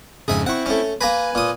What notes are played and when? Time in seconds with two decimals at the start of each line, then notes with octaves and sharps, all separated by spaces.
0.28 F2 G#2 C#3 G#4 E5 G#5
0.46 C4 E4 F#5 C#6
0.66 A3 C#4
1.01 A#3 B4 G#5 A#5 B5
1.35 A#2 D#6